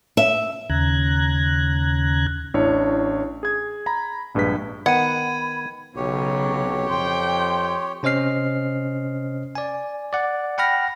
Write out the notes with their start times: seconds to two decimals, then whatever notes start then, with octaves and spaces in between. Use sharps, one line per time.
0.17 E5
0.70 D#2 C#3 A#5 F#6 G#6
2.54 A1 D4 E4 C#5
3.43 G#4 G#6
3.86 A#5 B5
4.35 A#1 G2 G#3 B4 B6
4.86 D#3 B3 F#5 B5 G#6 D#7
5.96 B1 C#3 F#3 G4 C#5
6.89 F2 G5 C6
8.03 C3 C#4 C5 D#5 F6 C7
9.55 D5 G#5
10.13 D5 F#5
10.58 F#5 G5 B5 F6 A#6